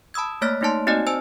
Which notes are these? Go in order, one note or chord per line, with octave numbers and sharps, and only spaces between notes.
A5 B5 D#6 E6 G#6
A3 A#3 C#5 F6 A6 B6
A3 A#3 D#4 C#5 A5 C6
C4 D#4 F#4 D5 D#5 G#5
C5 G#5 A5 E6